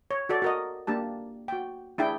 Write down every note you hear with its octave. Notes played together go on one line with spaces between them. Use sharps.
C#5
F#4 A4 D5
F#4 A#4 D#5
A#3 D4 G4 A5
F#4 G5
D4 E4 G#4 G5